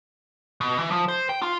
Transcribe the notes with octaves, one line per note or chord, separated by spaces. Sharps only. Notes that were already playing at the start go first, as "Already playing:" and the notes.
B2
E3
F3
C5
G5
F4